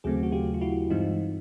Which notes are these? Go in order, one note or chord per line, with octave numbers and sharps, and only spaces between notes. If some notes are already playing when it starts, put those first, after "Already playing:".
D#2 C#3 F#3 A3 C4 F#4 G#4
F#4
F4 G4
F4
E4 F#4
G2 E3 G#3 C4 D#4 F4